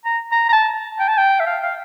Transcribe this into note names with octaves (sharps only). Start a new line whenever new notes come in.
A#5
A#5
A#5
A5
G5
A5
G5
E5
F5
F5